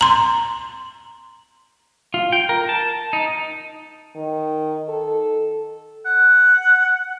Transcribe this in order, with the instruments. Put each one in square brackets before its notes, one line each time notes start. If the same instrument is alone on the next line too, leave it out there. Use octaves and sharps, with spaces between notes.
[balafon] A#5 C6
[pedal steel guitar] F4
G5
A#4
A5
D#4
[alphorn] D#3
A4
[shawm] F#5